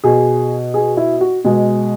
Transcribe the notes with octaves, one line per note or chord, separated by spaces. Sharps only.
B2 G#4
G#4
E4
F#4
B2 G#3